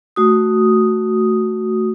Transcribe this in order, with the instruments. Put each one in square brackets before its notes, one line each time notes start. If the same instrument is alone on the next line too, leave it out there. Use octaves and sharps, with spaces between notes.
[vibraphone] A3 F#4 D#6